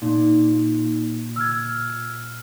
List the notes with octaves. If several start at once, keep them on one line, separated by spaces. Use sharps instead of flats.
A#2 D#4
E6 F6 G#6